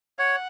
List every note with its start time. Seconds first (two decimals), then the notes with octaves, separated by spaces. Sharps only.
0.19 C#5 F#5